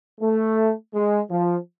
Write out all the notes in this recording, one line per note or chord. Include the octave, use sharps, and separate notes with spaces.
A3
G#3
F3